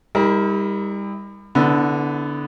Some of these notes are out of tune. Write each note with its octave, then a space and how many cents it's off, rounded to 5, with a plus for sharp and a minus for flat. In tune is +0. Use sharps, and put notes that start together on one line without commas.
G3 +30 E4 -45 A#4 +0
D3 -15 B3 +0 E4 -40